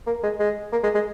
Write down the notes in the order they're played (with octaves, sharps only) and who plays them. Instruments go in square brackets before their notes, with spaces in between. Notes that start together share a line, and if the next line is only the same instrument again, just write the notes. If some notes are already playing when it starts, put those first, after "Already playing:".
[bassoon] A#3
G#3
G#3
A#3
G#3
G#3